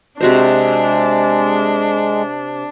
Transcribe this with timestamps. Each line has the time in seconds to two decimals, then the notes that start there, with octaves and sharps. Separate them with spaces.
0.20 C3 G#3 D4 F#4 C5